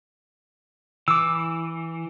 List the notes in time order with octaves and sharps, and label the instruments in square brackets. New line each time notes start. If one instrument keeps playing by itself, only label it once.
[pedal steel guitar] E3 [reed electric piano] D6 E6